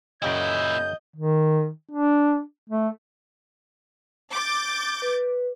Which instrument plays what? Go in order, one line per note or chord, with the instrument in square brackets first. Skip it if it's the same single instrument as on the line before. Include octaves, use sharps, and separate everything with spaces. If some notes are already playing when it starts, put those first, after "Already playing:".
[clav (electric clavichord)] F#2 C#3 G5 [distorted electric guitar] A#2 E4 [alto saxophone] D#5 [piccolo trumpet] G6
[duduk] D#3
D4
A3
[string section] D6 G6 A6
[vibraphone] B4